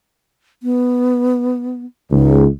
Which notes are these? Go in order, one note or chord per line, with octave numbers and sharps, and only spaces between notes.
B3
C#2 D#4